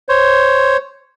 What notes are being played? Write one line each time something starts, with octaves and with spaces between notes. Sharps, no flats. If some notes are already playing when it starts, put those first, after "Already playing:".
C5 C#5